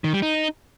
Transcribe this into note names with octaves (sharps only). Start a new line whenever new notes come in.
D#3
G3
D#4